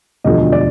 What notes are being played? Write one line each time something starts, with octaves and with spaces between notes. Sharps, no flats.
E1 D2 D3 F3 D#5
D5